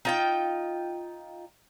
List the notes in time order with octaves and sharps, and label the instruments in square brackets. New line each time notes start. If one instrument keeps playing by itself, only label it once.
[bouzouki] D#4 F4 G5